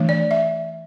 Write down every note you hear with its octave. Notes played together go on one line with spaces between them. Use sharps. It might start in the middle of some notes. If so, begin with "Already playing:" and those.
Already playing: E3 A3 D4
D5
E5